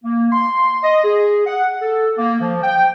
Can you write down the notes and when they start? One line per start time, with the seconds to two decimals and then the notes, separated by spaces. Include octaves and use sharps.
0.04 A#3
0.32 C6
0.83 D#5
1.04 G#4
1.46 F#5
1.82 A4
2.18 A#3
2.41 F3
2.63 G5